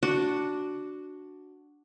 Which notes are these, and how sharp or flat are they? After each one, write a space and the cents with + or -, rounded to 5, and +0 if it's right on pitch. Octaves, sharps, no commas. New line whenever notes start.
D4 +0 F#4 +0